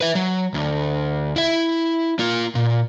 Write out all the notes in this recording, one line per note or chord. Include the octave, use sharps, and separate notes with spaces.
B4 E5
F#3
D2
E4 E5
A#3 F4
A#2